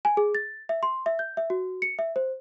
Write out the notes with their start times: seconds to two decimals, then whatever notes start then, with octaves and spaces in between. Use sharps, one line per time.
0.05 G#5
0.17 G#4
0.35 A6
0.69 E5
0.83 C6
1.06 E5
1.19 G6
1.37 E5
1.50 F#4
1.82 C#7
1.99 E5
2.16 C5